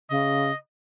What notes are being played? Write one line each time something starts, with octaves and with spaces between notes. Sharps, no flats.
C#3 D#5